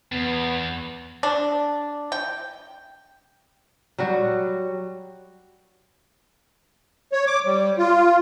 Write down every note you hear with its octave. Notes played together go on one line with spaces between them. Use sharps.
E2 B3
D4
G5
F#3 G3 F#4
C#5
D6
G3
F4